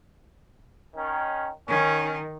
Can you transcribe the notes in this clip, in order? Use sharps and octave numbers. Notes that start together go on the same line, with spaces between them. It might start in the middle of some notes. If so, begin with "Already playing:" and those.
D#3 C#4
D#3 C#4